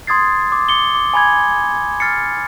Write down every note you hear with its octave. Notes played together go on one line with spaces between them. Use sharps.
C6 D#6 G#6 A6 C7
D6
D6 C#7 G7
D6
G#5 B5 G#6
F6 A6 C7 C#7